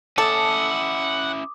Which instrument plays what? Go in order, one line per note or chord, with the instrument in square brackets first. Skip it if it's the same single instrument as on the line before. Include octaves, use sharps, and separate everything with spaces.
[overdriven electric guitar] C#4 E4 [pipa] A4 [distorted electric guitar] F#5 [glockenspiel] D6 D#6